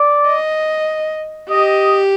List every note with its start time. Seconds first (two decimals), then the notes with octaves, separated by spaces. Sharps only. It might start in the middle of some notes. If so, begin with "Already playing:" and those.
Already playing: D5
0.27 D#5
1.49 G4 D#5